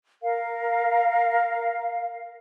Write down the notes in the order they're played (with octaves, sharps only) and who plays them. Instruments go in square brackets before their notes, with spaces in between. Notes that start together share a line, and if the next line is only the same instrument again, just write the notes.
[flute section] A#4 F5